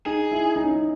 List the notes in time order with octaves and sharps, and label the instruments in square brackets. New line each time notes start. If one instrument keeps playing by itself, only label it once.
[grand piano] D#4 [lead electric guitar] G#4
[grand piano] E4
D#4
C#4
D#4